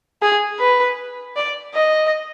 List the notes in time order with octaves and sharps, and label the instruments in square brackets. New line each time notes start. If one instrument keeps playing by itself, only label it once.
[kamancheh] G#4
B4
D5
D#5